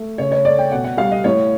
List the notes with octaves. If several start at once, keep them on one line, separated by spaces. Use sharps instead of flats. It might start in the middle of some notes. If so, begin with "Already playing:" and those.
Already playing: A3
C#3 C#5
C#5
A3 D5
G5
B2 F#5
F#5
G3 F5
D#5
A2 C#5